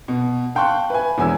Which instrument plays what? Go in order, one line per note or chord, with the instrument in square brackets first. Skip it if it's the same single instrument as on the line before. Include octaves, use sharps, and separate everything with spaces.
[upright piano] B2
F5 G5 A5 C6 C#6 F#6
B4 E5 G#5
E1 E2 G#5 E6